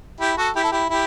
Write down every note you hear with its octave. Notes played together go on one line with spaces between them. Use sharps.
E4 G4
F#4 A4
E4 G4
A4
E4 G4
E4 G4